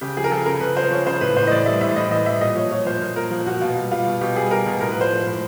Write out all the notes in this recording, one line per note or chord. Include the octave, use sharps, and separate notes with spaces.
C#3 G4
F3 G#4
A#4
F3 A4
C#3 A#4
C#3 B4
F3 C5
F3 C#5
C#3 C5
A2 B4
A2 C5
D#5
E3 D5
G3 E5
A2 E5
A2 D#5
E3 D#5
G3 E5
A#2 D#5
F3 C#5
F3 C#5
A#2 C5
A#2
F3 A#4
F3
A#2 F#4
B2 F4
G3
G3 F4
B2
B2 G4
G3 G#4
G3 A#4
B2
A2 A#4
B4
F3 C5
F3
A2